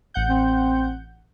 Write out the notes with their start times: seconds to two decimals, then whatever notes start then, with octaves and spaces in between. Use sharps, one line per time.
0.14 A1 F#5 G6
0.29 C4